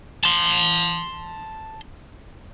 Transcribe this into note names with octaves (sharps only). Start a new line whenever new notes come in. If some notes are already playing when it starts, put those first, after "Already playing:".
A5 C6